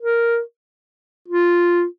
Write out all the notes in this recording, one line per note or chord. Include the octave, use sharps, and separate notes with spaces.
A#4
F4